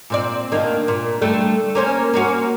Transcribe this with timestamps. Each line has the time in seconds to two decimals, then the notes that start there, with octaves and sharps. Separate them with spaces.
0.10 A#2 C4 D5
0.52 D2 D#3 A#3
0.88 A#2
1.22 D3 G3 A3
1.75 A#3 C#4 C5
2.14 A#3 C#4 F#4